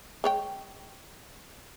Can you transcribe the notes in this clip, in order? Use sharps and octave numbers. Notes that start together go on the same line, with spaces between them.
G#3 C#5 G5